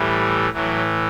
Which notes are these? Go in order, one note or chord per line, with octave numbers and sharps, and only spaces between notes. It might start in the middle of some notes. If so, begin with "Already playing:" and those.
Already playing: A2 E3 G3
A2 E3 F#3